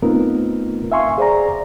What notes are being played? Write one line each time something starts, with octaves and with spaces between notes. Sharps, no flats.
A3 B3 C4 D#4 F4 A#4
E5 F5 G#5 C6 C#6
G#4 C5 D5 A#5